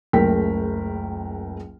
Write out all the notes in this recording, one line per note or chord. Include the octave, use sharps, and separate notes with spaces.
F#1 C#2 A3 A#4 G5 B6